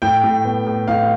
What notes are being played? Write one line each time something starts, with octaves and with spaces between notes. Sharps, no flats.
A2 G5
A2
B3
A2
A2 F5